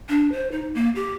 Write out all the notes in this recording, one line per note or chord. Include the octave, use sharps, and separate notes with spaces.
D4
C5
D#4
A#3
G4